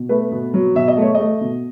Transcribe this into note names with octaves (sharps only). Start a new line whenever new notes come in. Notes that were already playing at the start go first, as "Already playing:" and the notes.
Already playing: B2
A3 B4
B2
F#3
B2 E5
D#5
A3 C#5
A3 D#5
B2